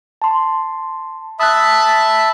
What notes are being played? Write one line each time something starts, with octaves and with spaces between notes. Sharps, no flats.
A5 C6
E5 A5 B5 D#6 F#6